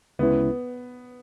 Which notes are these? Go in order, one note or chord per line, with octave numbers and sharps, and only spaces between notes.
D2 C#3 G#3 B3 C#4 E4